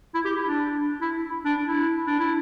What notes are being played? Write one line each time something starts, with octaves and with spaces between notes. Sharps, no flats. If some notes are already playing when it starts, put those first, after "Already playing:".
E4
G4
E4
D4
E4
D4
E4
D4
E4